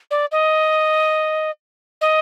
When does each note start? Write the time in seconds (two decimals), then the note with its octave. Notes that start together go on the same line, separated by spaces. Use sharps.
0.11 D5
0.32 D#5
2.01 D#5